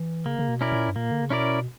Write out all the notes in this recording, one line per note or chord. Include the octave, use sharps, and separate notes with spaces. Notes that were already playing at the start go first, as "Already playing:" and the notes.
Already playing: E3
C#3 A#3
C#3
B2
C#4 E4 A#4 D5
A#2
G2
A#2 A#3
D3
C#3
B2 C#4 E4 A#4 D5